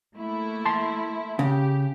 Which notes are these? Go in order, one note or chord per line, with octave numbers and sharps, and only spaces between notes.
A3 A#3 E4
A5 C6
C#3 G4